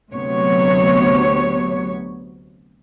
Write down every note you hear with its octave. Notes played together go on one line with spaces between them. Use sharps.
D2 C3 F#3 B3 C#5